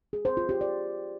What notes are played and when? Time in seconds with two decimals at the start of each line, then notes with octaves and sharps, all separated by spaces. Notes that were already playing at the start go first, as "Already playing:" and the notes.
0.13 G#4
0.25 C5
0.37 F4
0.49 G4
0.61 D5